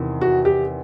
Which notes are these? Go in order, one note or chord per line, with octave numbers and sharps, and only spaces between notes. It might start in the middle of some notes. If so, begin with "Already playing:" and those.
Already playing: E2 C3 D#3
F#4
G4